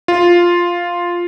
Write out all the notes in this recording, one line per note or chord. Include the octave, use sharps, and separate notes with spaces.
F4